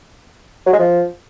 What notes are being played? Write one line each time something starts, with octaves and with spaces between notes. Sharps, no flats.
F#3
G#3
F3